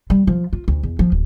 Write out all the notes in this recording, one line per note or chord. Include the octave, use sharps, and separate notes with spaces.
G3
F3
F4
D2
E2
F3
D1